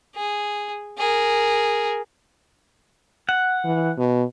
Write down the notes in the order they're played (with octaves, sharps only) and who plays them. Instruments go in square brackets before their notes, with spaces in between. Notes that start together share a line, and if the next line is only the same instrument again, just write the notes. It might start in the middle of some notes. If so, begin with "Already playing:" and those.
[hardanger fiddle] G#4
G#4 A#4
[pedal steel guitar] F#5
[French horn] E3
B2